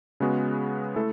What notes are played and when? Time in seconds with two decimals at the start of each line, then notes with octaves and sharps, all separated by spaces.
0.20 C#3 G#3 B3 F#4
0.96 A3 E4 A4